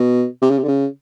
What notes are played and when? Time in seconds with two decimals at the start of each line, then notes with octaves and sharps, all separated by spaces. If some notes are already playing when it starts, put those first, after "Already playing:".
Already playing: B2
0.42 C3
0.50 C#3
0.59 C3
0.64 D3
0.68 C#3